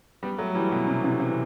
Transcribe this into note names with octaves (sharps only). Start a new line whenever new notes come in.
G3 B3
F#3 A3
E3 G3
B2
C3
C3 E3
C3 E3